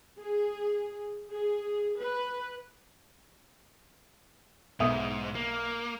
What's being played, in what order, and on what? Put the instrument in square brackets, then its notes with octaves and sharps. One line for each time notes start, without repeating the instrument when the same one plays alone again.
[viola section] G#4
G#4
B4
[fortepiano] B1 E5 D#6 [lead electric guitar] G#2
[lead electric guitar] A#3